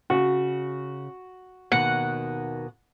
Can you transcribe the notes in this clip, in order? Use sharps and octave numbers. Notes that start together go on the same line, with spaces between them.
C#3 F#4
D#2 B2 D#3 F#5